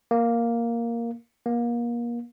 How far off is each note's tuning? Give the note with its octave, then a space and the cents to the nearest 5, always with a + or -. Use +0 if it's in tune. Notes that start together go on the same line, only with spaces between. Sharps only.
A#3 +0
A#3 +30